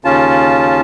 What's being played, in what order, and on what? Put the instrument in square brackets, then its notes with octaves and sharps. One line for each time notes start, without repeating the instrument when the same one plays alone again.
[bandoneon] D#2 C#3 C#4 F4 A5